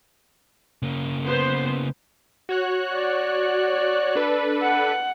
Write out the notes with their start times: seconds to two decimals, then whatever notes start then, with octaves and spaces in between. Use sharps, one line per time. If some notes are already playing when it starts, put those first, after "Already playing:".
0.82 C#3 A#3
1.25 B3 C5
2.49 F#4 C#5 F#6
2.93 D5
4.15 D4 A4 B4
4.62 F#5